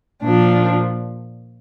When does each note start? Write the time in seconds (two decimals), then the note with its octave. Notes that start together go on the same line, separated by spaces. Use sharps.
0.22 A#2 F3 D4